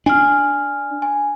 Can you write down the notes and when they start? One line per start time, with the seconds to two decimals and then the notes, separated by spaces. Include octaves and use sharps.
0.06 D4 G#5 F6
1.02 G#5